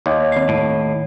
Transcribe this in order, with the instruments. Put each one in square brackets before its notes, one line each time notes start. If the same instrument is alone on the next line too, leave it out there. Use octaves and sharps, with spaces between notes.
[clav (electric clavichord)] D#2 [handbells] C#5
[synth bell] D#3 C7
[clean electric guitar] A2